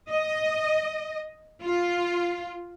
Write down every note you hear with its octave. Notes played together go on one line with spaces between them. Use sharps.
D#5
F4